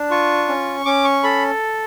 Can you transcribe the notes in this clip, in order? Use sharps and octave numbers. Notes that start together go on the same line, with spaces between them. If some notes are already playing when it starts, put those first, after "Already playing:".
Already playing: D4
F4 C#6
C#4
C#4 D6
C#6
A4 B5